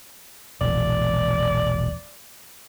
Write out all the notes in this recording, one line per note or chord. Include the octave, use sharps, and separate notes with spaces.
E1 A#1 D5